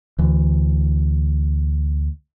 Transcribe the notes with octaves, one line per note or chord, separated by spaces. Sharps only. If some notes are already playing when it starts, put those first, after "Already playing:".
D2 E3